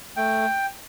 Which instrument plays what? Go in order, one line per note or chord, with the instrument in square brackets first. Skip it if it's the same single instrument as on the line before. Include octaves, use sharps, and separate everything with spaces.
[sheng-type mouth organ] A3 G5